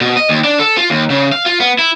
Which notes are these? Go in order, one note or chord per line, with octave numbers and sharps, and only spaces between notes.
B2
D#5
D#2
D4
A4
F4
D#2
C#3
F5
F4
B3
E4